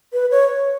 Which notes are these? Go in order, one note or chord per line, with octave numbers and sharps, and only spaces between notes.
B4
C#5